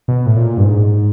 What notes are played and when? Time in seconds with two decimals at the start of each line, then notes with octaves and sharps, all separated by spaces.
0.08 B2
0.26 A2
0.36 A#2
0.58 G2
0.64 G#2